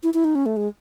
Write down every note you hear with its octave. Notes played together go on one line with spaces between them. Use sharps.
E4
E4
D#4
C#4
A3
G#3